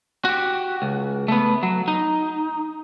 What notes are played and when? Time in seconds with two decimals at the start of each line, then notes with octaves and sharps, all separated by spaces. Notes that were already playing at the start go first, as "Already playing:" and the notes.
0.25 F#4 G4
0.82 C#2
1.28 A3 B3
1.63 F#3
1.88 D#4